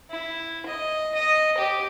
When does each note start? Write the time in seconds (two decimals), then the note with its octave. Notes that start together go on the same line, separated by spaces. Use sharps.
0.11 E4
0.66 D#5
1.15 D#5
1.58 G4